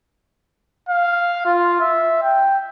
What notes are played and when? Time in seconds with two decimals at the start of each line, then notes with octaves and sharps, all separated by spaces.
0.89 F5
1.46 F4
1.81 E5
2.23 G5